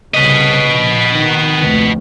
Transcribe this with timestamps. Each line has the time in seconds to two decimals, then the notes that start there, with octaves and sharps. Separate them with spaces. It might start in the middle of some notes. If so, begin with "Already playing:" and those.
0.14 C2 C#3 B4 D#5
0.65 A#1
1.14 D#3
1.62 F1 D2